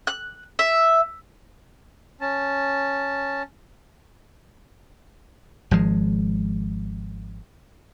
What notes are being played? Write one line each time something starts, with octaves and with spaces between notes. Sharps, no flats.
F#6
E5
C#4 A5
G#1 F3 G#3